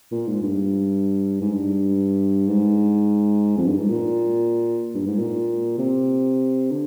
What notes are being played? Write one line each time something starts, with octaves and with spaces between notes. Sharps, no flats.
A#2
G#2
G2
G#2
G2
G#2
F2
G2
G#2
A#2
G2
G#2
A#2
C3
D3